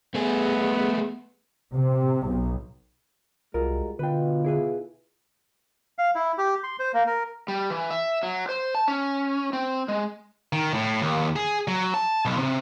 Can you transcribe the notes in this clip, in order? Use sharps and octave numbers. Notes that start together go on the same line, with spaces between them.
A3 B3 G#4
C3
B1
C2 G3 G#3 F4 F#4 A#4
B2 D3 F4 B4 G5
E4 G#4 B4
F5
E4
G4
C6
C5
A#3
A#4
G3
E3
E5
F#3
C5
A5
C#4
C4
G#3
D#3
A2
D#2
G#4
F#3
A5
B1
C3